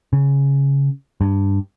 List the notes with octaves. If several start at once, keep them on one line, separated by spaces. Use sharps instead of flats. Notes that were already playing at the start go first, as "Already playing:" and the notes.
C#3
G2